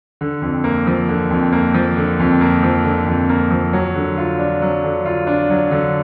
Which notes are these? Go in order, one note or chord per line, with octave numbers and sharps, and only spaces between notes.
D3
F2
A#3
F3
D3
F2
A#3
F3
D3
F2
A#3
F3
D3
F2
A#3
F3
F#3
D3
F4
D4
F#3
D3
F4
D4
F#3
D3